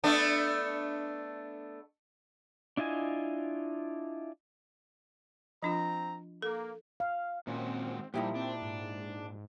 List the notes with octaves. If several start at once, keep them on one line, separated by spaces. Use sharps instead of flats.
A3 B3 D4
D4 E4 F4 D#5 G#5
F3 C4 D4 F4 A#5
A#3 A4
F5
A#2 D#3 G#3 C4 C#4 F4 F#4
A#2 F3 G3 D#4 E4 G4 G5 A#5
C4 D4
G#2